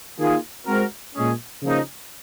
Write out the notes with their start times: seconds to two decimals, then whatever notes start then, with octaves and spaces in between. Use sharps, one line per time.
0.19 D#3 A#3 F4 G#4
0.67 G#3 C4 F#4 A#4
1.15 A#2 G#3 C#4 G#4
1.62 C#3 F3 A#3 D#4